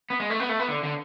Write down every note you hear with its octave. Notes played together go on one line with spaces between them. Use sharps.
B3
G#3
A3
B3
A3
B3
D3
D3